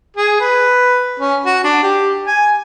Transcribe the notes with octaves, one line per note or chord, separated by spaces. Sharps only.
G#4
B4
C#4
F#4
D4
G4
G#5